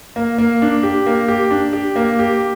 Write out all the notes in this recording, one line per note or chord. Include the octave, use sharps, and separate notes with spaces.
A#3
A#3
D4
G4
A#3
G4
D4
G4
A#3
G4